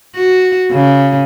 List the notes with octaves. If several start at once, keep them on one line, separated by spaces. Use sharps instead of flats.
F#4
C#3